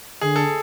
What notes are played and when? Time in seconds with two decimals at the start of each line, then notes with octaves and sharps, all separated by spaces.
0.21 D3 G#4
0.36 A4